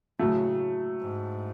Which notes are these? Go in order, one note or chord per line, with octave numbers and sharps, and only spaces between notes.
A2 C#3 F#3 A3
G#2